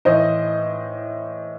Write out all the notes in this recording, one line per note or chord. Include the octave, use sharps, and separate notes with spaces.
A2 E3 C5 D#5